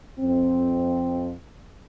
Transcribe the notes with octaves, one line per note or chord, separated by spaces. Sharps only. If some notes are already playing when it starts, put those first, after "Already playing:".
F2 C4